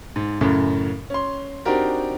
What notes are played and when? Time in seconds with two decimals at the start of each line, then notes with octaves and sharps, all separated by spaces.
0.16 G#2
0.41 F#2 A2 C#3
1.10 C#4 C6
1.65 C4 D4 D#4 F#4 G4 A#4